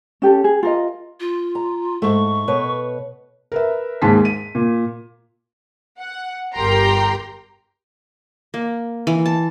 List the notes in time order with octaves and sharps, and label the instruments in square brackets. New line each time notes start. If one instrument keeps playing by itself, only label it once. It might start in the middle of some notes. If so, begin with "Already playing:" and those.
[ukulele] C#4 G4 A4
G#4
F4 A#4 D#5
[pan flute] F4
[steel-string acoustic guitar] A#5
[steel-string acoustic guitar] G#2 A3 [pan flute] C#6
[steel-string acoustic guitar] B2 B4 C#5
[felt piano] A#4 B4 E5
D#2 G#2 G#3 A5 B6
D#7
A#2
[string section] F#5
G1 G4 A#4 G5 A#5 C6
[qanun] A#3
E3
A5